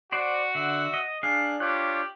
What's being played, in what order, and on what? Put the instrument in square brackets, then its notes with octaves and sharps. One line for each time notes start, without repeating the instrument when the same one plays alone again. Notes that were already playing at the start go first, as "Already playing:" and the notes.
[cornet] F#4 [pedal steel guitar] C5 D5
[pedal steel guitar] D3 [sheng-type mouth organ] E5 F#5
[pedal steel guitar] D#5
[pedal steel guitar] D4 F5 [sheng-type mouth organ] G#4 F#6
[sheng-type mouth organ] D4 F4 C#5 [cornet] G4 [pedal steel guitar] F#6